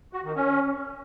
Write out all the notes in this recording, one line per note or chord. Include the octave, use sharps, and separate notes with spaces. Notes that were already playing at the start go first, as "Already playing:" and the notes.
F#4
D#3
C#4